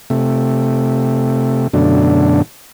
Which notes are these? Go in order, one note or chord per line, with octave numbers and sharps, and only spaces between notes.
C3 A3
F#2 B2 D3 A3 D4